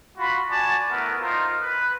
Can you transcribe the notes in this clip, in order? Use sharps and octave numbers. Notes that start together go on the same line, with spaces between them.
F4 F#4 B5
F#4 D5 G#5 A5
A3 B3 E4 A#4
D#4 F4 A#4 C5
B4